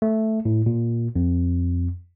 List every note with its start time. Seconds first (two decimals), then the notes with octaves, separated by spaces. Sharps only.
0.02 A3
0.45 A2
0.66 A#2
1.16 F2